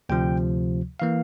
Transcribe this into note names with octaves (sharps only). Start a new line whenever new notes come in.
D2 C3 F3 G5
E3 A#3 F5